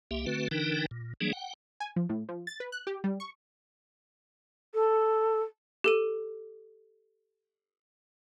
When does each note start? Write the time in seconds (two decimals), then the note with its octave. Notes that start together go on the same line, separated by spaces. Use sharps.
0.11 C2 A#3 G4 E5
0.26 D3 A3 C4 F#4 B4
0.51 D3 E3 D4 D#4 A#4 G5
0.91 A#2
1.21 E3 F#3 G3 A#3 D4 G#4
1.33 F#5 G5
1.80 G#5
1.96 F3
2.09 A2
2.29 F3
2.47 A6
2.60 B4
2.72 F#6
2.87 G4
3.04 G3
3.20 C#6
4.74 A4
5.84 G4 A4 D#7